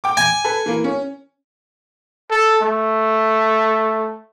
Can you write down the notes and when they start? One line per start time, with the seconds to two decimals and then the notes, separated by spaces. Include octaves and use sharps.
0.04 G5 D6
0.17 G#5
0.44 A4 B4
0.66 E3 A#3
0.84 C#4
2.31 A4
2.63 A3